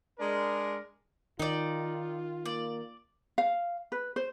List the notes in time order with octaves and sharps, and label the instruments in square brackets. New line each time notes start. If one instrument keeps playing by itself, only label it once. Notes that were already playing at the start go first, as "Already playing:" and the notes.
[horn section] G#3 D4 A#4
[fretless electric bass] D#3 [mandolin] D#4 D5 [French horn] F4
[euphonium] A#3 [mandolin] D5
[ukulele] F5
B4
C5